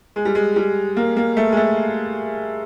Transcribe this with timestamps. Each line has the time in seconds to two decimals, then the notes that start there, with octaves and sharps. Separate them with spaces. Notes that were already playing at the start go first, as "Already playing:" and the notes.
0.16 G#3
0.25 G3
0.35 G#3
0.56 G3
0.97 A#3
1.16 A#3
1.37 A3
1.52 G#3
1.57 A3